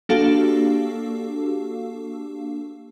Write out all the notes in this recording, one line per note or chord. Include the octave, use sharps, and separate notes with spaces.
A#3 D4 F#4 G4 A4 F5